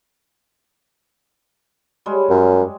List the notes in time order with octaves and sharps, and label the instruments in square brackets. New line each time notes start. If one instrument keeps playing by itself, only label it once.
[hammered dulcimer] G3 G#3 C#5
[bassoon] F#2